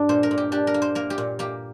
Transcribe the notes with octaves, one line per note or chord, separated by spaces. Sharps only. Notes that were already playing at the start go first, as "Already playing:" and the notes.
Already playing: G2 D4
A#2 C5
A#4
A#2
G4
D4 G4
A#4
A#3
C5
A#3 A#4
G4
A#2
A#3 G4